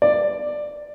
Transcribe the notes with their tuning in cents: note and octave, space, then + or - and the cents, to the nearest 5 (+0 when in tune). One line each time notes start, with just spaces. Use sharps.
D5 +10